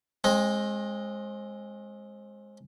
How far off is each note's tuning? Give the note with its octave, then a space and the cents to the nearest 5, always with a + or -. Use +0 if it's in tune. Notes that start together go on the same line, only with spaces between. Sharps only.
G#3 +0 C4 +30